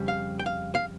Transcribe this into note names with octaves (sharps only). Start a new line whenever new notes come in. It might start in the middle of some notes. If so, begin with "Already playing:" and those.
Already playing: F2 C#3 G3
F5
G5
F5
F5